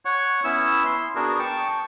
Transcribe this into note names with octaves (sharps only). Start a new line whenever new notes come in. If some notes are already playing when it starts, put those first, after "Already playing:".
C#5 F#5 C#6
B3 C#4 E4 E6
C6
B3 D4 F#4 G#4 A#4
G5 A5 C#6